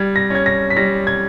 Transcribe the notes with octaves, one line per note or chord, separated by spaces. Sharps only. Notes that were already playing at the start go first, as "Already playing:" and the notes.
Already playing: G3 G#6
A#6
C#4 G#6
A#6
B6
G3 A#6
G#6